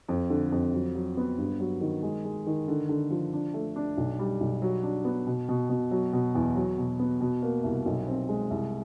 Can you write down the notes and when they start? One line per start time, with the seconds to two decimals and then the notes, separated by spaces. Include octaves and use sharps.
0.09 F2
0.30 D3
0.52 F2
0.73 F#3
0.95 F#3
1.17 B3
1.38 G2
1.60 F#3
1.81 D#3
2.03 G#3
2.25 G#3
2.46 D#3
2.68 D3
2.89 D3
3.11 F3
3.33 D4
3.54 A3
3.76 D4
3.97 B1
4.19 G3
4.41 B1
4.62 F#3
4.83 D4
5.05 B3
5.27 B2
5.49 B2
5.69 B2
5.91 F#3
6.13 B2
6.35 E2
6.56 F#3
6.78 B2
6.99 B3
7.21 B2
7.42 A#3
7.64 C2
7.86 B1
8.08 C4
8.29 G#3
8.50 C2